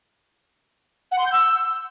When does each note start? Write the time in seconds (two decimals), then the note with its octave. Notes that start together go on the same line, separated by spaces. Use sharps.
1.11 F#5
1.18 C6
1.25 G6
1.32 E6